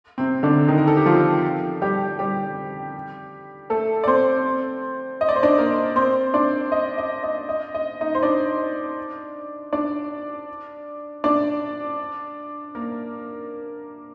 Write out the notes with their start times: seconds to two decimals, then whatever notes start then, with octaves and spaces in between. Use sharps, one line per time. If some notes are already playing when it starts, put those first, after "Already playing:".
0.18 C3 C4
0.43 D3 D4
0.68 D#3 D#4
0.78 A#4
0.88 A4
0.97 G4
1.06 F3 F4
1.82 G3 G4
2.19 G3 G4
3.70 A3 A4
4.04 D5
4.07 C4 C5
5.21 D#5
5.29 D5
5.36 C5
5.43 D4 D5
5.58 A#3 A#4
5.96 C4 C5
6.34 D4 D5
6.72 D#5
6.98 D#5
7.23 D#5
7.49 D#5
7.75 D#5
8.01 D#4 D#5
8.15 C5
8.23 D4 D5
9.73 D4 D5
11.24 D4 D5
12.75 A#3 A#4